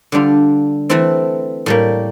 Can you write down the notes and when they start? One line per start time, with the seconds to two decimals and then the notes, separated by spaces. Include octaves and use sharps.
0.12 D3 G3 D4 F4
0.89 E3 A3 C4 E4
1.66 A2 G3 A#3